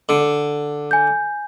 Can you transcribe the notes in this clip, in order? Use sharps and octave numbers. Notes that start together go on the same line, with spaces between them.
D3
G#5 G6